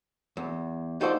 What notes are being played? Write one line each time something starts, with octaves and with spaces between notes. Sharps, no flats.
E2
D#4 F4 F#4 A4 C5 D5